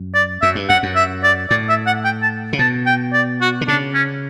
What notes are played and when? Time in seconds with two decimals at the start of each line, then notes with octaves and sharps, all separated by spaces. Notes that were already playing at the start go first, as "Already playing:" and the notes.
Already playing: F#2
0.15 D5
0.42 F#2 E5
0.55 G2
0.69 F#2 F#5
0.83 F#2
0.96 E5
1.24 D5
1.50 A2 D5
1.69 E5
1.87 F#5
2.05 G5
2.22 A5
2.53 C#3
2.59 B2 A5
2.86 G5
3.13 D5
3.41 F#4
3.61 D3
3.68 C#3 D4
3.94 C#4